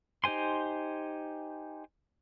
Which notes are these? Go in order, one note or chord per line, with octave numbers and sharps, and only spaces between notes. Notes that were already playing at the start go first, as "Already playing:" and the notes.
D#4 G4 C5 G#5 C6